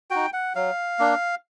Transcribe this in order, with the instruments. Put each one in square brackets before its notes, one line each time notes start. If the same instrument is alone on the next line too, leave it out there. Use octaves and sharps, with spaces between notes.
[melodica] D#4 F#4 G5
F#5
F#3 F5
A#3 D4